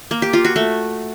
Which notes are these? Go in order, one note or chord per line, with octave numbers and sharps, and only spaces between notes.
A#3
G4
F4
F#4
A3